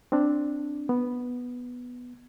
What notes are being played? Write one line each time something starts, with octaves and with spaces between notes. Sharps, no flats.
C4 D4
B3